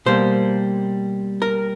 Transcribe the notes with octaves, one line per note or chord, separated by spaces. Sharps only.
B2 G3 A#3 C5
A#4